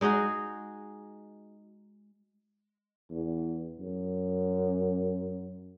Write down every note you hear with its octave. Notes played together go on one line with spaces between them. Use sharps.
G#3 D#4 F#4 G#4
E2
F#2